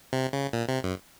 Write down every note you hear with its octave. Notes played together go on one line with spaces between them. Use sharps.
C3
C#3
A#2
C3
F#2